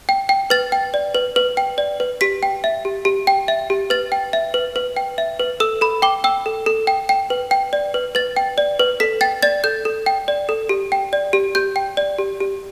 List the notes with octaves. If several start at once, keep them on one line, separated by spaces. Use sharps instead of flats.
G5
G5
B4 A6
G5
D5
B4
B4
G5
D5
B4
G4 B6
G5
E5
G4
G4
G5
E5
G4
B4 A6
G5
E5
B4
B4
G5
E5
B4
A4 E6
A4 B5
G5 D6
G5 E6
A4
A4
G5
G5
B4
G5
D5
B4
B4 A6
G5
D5
B4
A4 B6
G5 A6
D5 A6
A4 G6
A4
G5
D5
A4
G4
G5
D5
G4
G4 G6
G5
D5
G4
G4